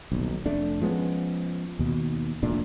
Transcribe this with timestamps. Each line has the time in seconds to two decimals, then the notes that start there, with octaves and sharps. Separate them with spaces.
0.12 D#1 B1
0.46 F1 A3 D4
0.82 F3 G#3 B3 C#4
1.79 D#2 B2
2.43 F1 A#2 A3 D4